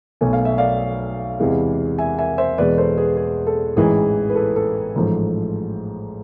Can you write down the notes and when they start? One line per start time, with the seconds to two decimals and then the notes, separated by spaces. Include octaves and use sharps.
0.21 B1 B2 A3 G#5
0.33 F5
0.45 E5
0.58 D5 F5
1.40 E2 C3 E3 G#3
1.99 E5 G#5
2.19 E5 G#5
2.38 C5 E5
2.58 E2 B2 G#3 B4 D5
2.78 A4 C5
2.98 G#4 B4
3.17 G#4
3.47 A4
3.76 A1 G#2 E3 G#3 G#4
4.30 B4
4.35 A4
4.56 A4
4.96 A1 G#2 F3 A3